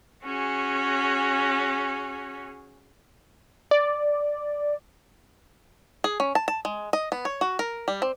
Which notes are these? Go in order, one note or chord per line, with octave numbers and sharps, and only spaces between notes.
C#4 F#4 G#4
D5
G#4
C#4
A5
A5
G#3
D#5
B3
C#5
F#4
A#4
G3
C4